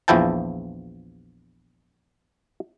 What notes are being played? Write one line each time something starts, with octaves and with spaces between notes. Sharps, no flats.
A#1 E2 F3 E4 G5 A5